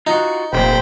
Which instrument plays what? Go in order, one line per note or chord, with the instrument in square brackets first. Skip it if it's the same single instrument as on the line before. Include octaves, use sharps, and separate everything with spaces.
[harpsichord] D#4 [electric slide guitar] F4 F#4
[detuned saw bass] F1 [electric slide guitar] A#2 [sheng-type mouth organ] C5 G5 B5